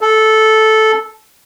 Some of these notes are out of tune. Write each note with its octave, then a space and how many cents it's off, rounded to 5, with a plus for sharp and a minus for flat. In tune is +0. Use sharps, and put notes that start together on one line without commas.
A4 -10